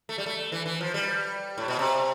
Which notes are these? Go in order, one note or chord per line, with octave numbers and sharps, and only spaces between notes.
A3
G3
A3
E3
E3
F3
G3
A2
B2
C3